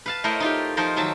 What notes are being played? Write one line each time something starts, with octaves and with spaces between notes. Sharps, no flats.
B4 F5 A5
A3 E4 A#4 C5 C#5 D#5
D#4 F4 G4
F3 D#4 A#4 C5
D#3 F#3 E5 A5